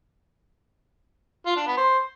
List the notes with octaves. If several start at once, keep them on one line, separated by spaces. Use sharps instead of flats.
F4
D4
B3
C5